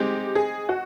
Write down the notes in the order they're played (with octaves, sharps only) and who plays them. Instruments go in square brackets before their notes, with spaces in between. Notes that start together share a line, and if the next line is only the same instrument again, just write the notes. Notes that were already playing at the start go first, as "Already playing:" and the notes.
Already playing: [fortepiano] G#3 C4 D#4 [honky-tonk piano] G4
[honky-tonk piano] G#4
F#4